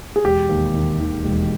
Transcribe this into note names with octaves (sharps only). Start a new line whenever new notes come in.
G#4
E1 G4
D#2
D#3
D#3
E1